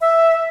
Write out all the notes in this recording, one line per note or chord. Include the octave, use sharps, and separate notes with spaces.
E5